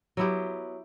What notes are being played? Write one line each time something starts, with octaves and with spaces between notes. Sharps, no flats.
F#3 B3 E4 G4